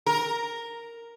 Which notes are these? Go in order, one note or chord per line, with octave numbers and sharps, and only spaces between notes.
A#4